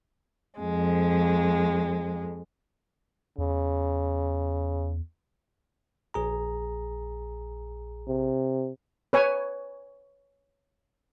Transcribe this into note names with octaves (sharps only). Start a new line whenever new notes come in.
F2 G#3
E2 C#3
A#1 G#4 A#5
C3
B4 C#5 G#5